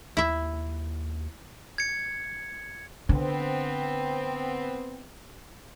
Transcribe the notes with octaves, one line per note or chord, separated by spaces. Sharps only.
D#2 E4 E5
G#6 C#7
D3 B3 C4